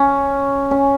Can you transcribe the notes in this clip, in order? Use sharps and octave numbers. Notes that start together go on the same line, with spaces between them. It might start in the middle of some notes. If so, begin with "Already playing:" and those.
Already playing: C#4
C#4